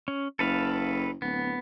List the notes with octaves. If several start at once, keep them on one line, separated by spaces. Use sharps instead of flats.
C#4
F#1 A4 B4 F5
D1 B3